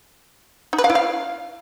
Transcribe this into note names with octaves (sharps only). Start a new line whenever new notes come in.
D#4
B4
F5
E4
F5